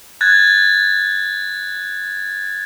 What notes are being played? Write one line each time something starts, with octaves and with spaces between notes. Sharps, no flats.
F#6 G#6 A6